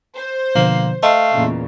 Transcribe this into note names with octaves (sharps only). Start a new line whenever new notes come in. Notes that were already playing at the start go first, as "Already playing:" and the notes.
C5
B2 D3 F3 A#3
A3 D#5 F5 C6
E2 A#2 C#3